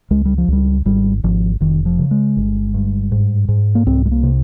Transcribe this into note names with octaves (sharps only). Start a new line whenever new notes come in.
C#2 G#3
G3
F3
C#2 G3
G#1 G3
G#1 F3
F1 D#3
F3
C#3
G#3
G1
G2
G#2
G#2
A#3
C2 C4
G#3
A#3
C3